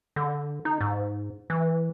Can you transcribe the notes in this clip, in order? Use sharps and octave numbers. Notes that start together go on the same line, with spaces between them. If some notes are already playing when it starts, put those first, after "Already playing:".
D3
D#4
G#2
E3